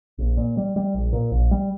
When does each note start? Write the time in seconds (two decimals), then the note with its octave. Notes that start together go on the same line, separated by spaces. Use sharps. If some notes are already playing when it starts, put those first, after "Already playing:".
0.18 A#1
0.37 A#2
0.57 G3
0.76 G3
0.94 A#1
1.13 A#2
1.31 A#1
1.51 G3